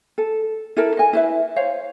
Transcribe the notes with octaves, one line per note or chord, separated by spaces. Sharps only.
A4
E4 A4 A#4
D#5 G#5
E4 B4 E5
C5 C#5 F5